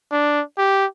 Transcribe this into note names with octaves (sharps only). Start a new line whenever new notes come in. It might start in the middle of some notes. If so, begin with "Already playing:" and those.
D4
G4